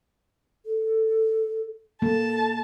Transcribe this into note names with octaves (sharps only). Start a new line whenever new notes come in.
A4
A#3 A4 A5